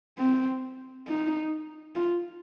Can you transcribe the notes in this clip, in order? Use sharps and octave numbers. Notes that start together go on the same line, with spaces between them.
C4
D#4
F4